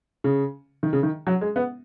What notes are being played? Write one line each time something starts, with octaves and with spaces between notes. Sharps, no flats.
C#3
D#3
C#3
D#3
F#3
G#3
B3